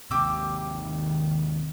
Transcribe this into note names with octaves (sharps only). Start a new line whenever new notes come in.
D#2 C3 G4 D6 E6
D#3